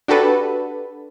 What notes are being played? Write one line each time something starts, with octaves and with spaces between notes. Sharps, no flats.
D4 F#4 G4 A4 B4